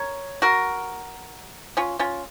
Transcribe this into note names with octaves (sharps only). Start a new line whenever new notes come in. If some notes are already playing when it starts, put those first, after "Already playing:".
Already playing: A#4 C#5
F#4 A#4
C#4 F4
C#4 F4